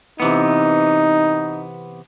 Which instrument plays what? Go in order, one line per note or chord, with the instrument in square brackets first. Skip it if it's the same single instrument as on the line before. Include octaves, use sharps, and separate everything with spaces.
[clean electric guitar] C3 E3 B3 [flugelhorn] D#4